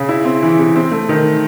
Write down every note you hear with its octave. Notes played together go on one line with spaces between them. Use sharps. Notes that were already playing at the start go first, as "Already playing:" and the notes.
Already playing: C#3
E4
C4
E3
C3
C4
A3
D#3